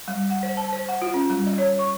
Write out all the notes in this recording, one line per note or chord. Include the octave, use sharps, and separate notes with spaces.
G3
F#5
C5
A5
C5
F#5
F4
C#4
G3
D#5
C#5
C#6